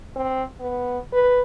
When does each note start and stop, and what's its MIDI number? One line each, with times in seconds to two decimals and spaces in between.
0.16 0.43 60
0.60 0.98 59
1.13 1.43 71